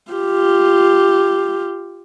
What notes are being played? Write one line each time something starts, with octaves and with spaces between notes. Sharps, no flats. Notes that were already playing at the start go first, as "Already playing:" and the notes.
F4 G4